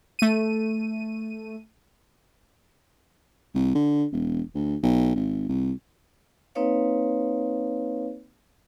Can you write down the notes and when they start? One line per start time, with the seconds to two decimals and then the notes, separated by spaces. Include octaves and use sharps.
0.19 A3 D#7
3.54 C2
3.75 D3
4.12 E1
4.55 D2
4.83 B1
5.16 G#1
5.49 C2
6.55 A#3 C4 D#4 B4 C#5 F5